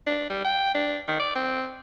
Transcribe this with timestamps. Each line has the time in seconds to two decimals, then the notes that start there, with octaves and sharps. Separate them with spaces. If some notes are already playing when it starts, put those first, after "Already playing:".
0.07 D4
0.30 G3
0.45 G5
0.74 D4
1.08 D#3
1.19 D5
1.35 C4